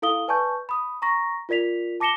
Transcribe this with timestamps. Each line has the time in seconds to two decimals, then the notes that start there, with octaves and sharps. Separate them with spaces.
0.02 E4 A4 F5 D#6 G7
0.28 B4 D5 G#5 A5 C#6 G6
0.69 B5 D#6
1.02 A#5 C#6 A#6
1.49 F4 A#4 D5 B6 F7
2.00 A5 D6 A#6 C#7 E7 G7